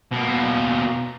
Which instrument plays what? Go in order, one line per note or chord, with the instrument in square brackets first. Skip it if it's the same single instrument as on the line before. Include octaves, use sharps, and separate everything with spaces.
[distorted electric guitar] B2 A#3